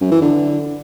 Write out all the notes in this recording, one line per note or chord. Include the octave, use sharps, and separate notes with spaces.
F#2
E3
D3